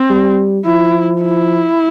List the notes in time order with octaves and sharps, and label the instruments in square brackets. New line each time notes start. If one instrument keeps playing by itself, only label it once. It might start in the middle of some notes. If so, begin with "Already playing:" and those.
Already playing: [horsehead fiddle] C4
[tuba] G3
[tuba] F3 [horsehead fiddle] E4
[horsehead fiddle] E4